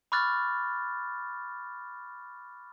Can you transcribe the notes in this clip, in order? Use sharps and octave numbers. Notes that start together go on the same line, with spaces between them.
B5 C#6 D6 F6 F#6 A6